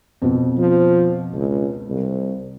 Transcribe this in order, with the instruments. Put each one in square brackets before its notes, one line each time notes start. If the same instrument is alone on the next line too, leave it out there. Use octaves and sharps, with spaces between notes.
[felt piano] F2 B2
[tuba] F3
C#2
C2